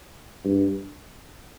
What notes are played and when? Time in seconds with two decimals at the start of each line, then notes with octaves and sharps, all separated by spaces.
0.45 G2